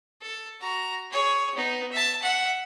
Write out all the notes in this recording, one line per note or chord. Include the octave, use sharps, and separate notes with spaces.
A4
F#4 A#5
G#4 C#5
B3 D#4
E5 A5
E5 F#5